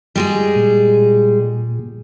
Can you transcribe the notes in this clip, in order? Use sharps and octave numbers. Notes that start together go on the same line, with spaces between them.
G3 G#3 G#4
A#2